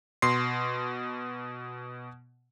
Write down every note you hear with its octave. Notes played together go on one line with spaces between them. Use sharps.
B2 C6 C7